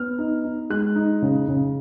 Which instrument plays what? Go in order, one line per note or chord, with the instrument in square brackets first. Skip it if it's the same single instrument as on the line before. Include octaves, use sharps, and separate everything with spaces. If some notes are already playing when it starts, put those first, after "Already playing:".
Already playing: [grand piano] B3 F6
D#4
D#4
G#3 F#6
D#4
C#3
C#3